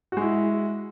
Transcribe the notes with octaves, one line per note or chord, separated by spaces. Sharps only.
G#3 E4 F#4